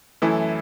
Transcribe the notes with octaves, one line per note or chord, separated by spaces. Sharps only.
F#2 E3 A3 E4